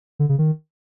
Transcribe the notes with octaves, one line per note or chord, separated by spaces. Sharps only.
D3
C#3
D#3